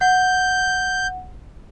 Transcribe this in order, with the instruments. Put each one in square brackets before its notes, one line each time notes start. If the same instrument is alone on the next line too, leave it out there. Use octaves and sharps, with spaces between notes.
[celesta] F#5 [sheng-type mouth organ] G6